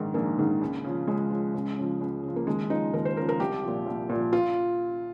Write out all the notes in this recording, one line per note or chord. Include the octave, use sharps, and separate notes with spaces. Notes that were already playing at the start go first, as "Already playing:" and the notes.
Already playing: A#1 G#2 D#3
A#1 A#3
G#2 D#3
C#2
C#3 F3
C#2 G#3
C#3 F3
C#2
C#3 F3
C#2
C#3 F3
A#3
D#2 G#3
C#3 F3 D#4
D#2 A#4
C5
C#3 F3 A#4
A#4
C2 G4
A#2 F3
C2
A#2 F3
F4